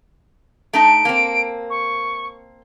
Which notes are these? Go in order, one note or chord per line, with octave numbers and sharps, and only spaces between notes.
A3 D#4 A5 D7
A#3 C4
C#6